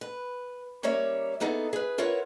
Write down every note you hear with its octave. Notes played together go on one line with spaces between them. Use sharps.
B4
G3 A#3 C#4 C#5 E5
A#3 B3 D#4 G#4 A4
G#4 B4
E4 F4 A#4 B4 C#5 F#5